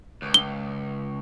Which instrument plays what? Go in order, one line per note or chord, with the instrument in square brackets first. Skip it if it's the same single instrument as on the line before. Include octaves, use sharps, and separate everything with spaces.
[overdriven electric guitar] C#2
[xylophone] G7